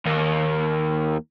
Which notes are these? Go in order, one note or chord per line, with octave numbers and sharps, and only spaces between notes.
D#2 A#3